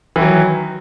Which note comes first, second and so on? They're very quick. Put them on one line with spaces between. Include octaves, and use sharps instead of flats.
E3 D#3 F#3